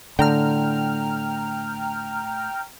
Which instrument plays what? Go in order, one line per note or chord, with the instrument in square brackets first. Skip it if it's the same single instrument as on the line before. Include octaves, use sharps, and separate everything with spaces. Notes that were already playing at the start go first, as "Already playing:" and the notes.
[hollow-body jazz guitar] A2 [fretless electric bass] D3 [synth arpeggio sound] G5 A#5 F6